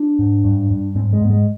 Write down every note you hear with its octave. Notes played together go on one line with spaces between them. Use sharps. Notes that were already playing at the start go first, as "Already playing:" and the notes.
Already playing: D4
G#2
G2
G2
G#2 C4
G#3
G#2 B3
G#3